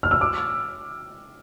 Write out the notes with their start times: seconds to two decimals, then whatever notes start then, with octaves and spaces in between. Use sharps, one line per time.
0.03 F6
0.11 E6
0.21 D6